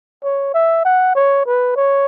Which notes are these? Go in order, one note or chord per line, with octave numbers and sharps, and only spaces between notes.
C#5
E5
F#5
C#5
B4
C#5